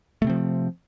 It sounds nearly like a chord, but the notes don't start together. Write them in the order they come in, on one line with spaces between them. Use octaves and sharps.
A3 C3 C4 F3